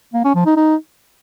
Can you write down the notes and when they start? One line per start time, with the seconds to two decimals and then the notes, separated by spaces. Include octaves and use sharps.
0.14 A#3
0.24 C#4
0.35 F3
0.46 D#4
0.57 D#4